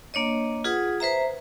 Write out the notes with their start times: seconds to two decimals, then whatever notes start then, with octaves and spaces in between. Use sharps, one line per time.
0.14 A#3 D4 C#5 D#5
0.64 F4 G#4 B4 F#5 D#6
1.00 B4 C5 E5 A#5